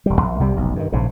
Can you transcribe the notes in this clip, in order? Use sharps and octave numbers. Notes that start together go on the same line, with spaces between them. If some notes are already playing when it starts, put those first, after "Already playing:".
E1 G3
A#1
C2 C3 G3
F1 B1
G2 D3 D#3
A#1 G#2 C#3